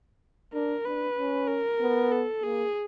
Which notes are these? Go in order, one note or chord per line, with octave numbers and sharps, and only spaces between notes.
D4 A#4
D4 B4
C#4
A#4
B3
A4
A#3 G#4